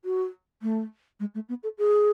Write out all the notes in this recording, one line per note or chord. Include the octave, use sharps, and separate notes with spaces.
F#4
A3
G#3
A3
B3
A4
G#4